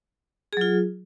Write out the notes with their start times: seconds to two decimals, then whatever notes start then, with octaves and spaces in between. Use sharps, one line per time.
0.53 G#4
0.57 F#3
0.61 F4